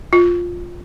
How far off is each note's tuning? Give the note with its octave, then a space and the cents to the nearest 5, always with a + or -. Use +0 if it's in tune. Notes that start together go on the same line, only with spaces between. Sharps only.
F4 +10